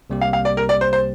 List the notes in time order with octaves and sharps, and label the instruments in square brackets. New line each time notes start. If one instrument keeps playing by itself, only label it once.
[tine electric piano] C2 C3 G3 A#3 G4
[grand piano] F5
F5
D5
A#4
D5
C5
C5